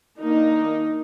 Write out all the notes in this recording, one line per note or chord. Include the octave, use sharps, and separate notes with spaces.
D#3 A#3 D4 D#4